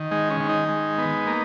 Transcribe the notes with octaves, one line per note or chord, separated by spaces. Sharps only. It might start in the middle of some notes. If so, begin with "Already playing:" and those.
Already playing: D#3
G#3 D#4
C#4
D#3
D#4
G#3
B3
A#3